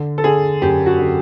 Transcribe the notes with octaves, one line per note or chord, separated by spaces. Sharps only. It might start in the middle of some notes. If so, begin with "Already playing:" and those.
Already playing: D3
A4
D3 G#4
F#2 G4
F#4
D3